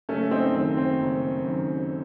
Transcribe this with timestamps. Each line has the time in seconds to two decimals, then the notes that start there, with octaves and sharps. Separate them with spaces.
0.09 F#1 A3 C#4
0.31 C4 D#4
0.54 F#2 D#3 C4
0.77 C4
1.00 F#1
1.44 F#2 D#3